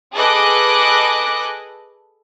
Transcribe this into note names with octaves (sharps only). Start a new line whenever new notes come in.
G#4 A4 B4 D#5 D6 F#6